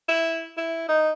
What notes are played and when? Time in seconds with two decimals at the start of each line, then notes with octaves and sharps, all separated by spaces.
0.09 E4
0.58 E4
0.89 D#4